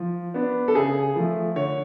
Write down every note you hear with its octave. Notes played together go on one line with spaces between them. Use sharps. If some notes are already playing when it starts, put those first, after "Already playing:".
Already playing: F3
B3 D4
A4
C#3 G#4
F3 A3
D3 C#5